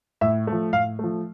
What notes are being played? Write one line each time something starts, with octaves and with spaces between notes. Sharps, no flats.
A2 E5
F3 A3
A2 F5
F3 A3